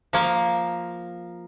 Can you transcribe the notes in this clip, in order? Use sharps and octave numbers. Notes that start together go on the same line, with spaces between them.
F3 A#3